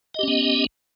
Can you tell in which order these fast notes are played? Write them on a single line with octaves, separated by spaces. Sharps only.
D#5 G4 C#4 B3